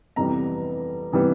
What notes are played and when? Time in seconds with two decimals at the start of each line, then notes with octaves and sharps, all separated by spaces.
0.16 F2 C3 E3 G3 B3 A#5
1.12 C3 E3 G3 B3